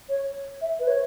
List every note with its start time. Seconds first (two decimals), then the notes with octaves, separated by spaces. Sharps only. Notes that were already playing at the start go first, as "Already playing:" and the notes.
0.09 C#5
0.62 E5
0.80 B4
0.87 C#5